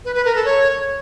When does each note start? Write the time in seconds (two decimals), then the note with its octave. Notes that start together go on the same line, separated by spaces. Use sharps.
0.05 B4
0.15 B4
0.25 A#4
0.35 A4
0.45 C#5